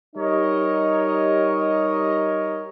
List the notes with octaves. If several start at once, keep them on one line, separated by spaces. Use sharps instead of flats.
G3 D#4 G4 A#4 C#5 D#5